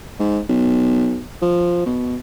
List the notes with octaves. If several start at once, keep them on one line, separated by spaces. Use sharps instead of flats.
G#2
B1
F3
B2